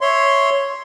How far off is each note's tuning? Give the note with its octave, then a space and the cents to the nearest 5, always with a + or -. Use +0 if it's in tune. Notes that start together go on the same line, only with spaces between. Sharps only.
C#5 +0 E5 +0 C6 +0